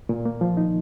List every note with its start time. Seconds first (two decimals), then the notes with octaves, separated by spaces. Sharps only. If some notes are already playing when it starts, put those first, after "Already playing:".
0.09 A#2
0.25 A#3
0.41 F3
0.57 D#4